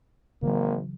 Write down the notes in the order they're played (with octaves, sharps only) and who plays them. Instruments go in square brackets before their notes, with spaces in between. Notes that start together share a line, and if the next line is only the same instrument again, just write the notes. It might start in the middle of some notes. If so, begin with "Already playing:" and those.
[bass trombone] G#1 [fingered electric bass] C#3 E3 F#3 [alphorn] A#3